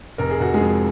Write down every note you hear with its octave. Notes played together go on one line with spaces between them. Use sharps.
F1 A#4
G#4
F1 F#4
G#3 G#4
F2